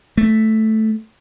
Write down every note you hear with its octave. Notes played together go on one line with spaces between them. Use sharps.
A3